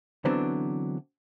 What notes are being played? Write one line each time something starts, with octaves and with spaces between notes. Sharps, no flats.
D3 E3 F#3 B3 C4 D4